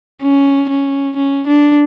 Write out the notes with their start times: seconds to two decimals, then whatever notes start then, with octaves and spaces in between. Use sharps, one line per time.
0.22 C#4
0.69 C#4
1.17 C#4
1.47 D4